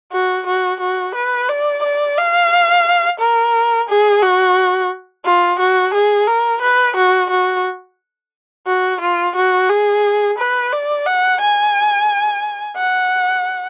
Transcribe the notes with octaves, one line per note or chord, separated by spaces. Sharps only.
F#4
F#4
F#4
B4
D5
D5
F5
A#4
G#4
F#4
F4
F#4
G#4
A#4
B4
F#4
F#4
F#4
F4
F#4
G#4
B4
D5
F#5
G#5
F#5